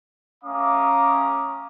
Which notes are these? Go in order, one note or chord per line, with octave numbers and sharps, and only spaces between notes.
A3 C#4 F5 A#5 D6 D#6